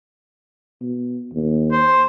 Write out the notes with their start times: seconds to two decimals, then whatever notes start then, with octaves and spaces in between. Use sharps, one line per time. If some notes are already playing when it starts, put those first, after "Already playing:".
0.81 B2
1.33 D#2
1.72 C5